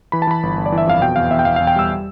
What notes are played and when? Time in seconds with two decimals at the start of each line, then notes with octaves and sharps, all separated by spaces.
0.12 E3 B5
0.22 A5
0.27 E3 B5
0.43 G1
0.57 G1
0.66 D5
0.72 E3
0.78 E5
0.86 F2 F5
1.01 B2 G5
1.16 E2 F5
1.30 E2 E5
1.39 G5
1.45 E2 F5
1.56 F5
1.60 E2
1.67 G5
1.76 G3 E6